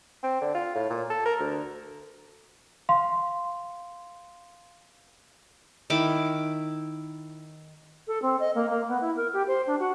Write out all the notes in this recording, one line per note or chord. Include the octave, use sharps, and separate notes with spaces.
C4
D3
F4
A2
A#2
A4
A#4
D2
F5 C6
D#3 E4 D6
A4
C4
D#5
A#3
A#3
B3
E4
A#4
G4
C5
D4
F#4